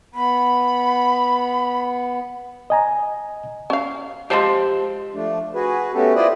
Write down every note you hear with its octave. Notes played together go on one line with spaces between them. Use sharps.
B3 B5
D#5 G#5 A#5
C#4 F5
F3 G#3 G4 C5 A5
F3 A3 D4
F#4 G#4 B4
A3 B3 C#4 F#4 G4 A4
E4 F4 B4 C5 D5 D#5